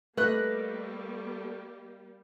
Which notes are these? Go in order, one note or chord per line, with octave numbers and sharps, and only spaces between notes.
G3 A3 A#3 B4 D#5 B5 F#6